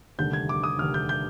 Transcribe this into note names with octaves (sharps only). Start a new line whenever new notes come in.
F1 D#2 D3 G3 G6
G#6
D6
D#6
F1 D#2 D3 G3 F6
G6
G6